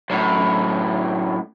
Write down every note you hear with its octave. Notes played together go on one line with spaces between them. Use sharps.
F#2 A2